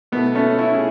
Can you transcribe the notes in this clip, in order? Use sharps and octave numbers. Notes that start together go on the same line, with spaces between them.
B2 A3 B3
A3 C#4
C#4 E4
G#4